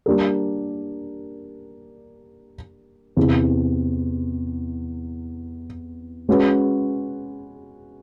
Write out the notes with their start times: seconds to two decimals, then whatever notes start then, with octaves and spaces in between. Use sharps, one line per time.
0.06 G3 A#3 D4 G4 A#4
3.17 E2 C3 E3
6.29 G#3 C#4 F#4 B4